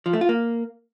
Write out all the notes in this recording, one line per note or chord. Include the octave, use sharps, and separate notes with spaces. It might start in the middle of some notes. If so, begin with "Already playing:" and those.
F3
A3
F4
A#3